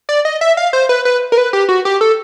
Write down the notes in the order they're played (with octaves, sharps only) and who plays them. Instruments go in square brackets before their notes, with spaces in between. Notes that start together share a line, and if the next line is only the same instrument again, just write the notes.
[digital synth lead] D5
D#5
E5
F5
C5
B4
B4
A#4
B4
G4
F#4
G4
A4